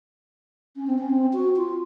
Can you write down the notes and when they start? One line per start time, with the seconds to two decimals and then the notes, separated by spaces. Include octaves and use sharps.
0.76 C#4
0.87 C4
0.98 C#4
1.10 C4
1.33 F#4
1.56 F4